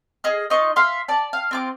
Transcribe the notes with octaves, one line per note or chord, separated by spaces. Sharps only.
G#4 D#5 F6
D#4 F4 D#5 C#6
E5 F5 C6
D5 A5
F5
C4 F4 D6